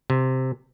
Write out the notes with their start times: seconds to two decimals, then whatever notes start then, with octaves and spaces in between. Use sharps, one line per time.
0.10 C3